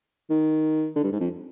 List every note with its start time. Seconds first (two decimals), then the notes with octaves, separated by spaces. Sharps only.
0.30 D#3
0.96 D3
1.04 G2
1.12 G#2
1.20 F2